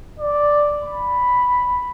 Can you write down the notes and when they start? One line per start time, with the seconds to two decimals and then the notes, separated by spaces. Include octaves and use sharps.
0.19 D5
0.84 B5